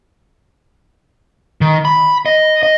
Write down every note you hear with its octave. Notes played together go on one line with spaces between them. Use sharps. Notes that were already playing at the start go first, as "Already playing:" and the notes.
D#3
B5
D#5
D#5